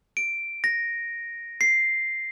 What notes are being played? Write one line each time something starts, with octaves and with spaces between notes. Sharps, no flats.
D7
A#6
C7